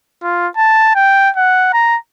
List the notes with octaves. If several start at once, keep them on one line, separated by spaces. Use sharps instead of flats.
F4
A5
G5
F#5
A#5